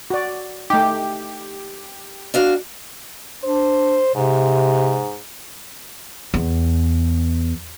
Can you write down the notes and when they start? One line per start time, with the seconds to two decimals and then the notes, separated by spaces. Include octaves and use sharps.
0.10 F#4 D5
0.70 A3 D#4 G4
2.34 D4 F#4 F5
3.44 D4 C5
4.15 G#2 C3
6.34 E2